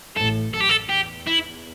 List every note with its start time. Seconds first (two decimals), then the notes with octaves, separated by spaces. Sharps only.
0.16 A1 A2 A4
0.53 F#2 A4
0.60 G4
0.69 A4
0.89 E2 G4
1.27 E4